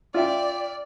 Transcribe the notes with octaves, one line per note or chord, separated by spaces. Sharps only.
F4 D5 E5 G5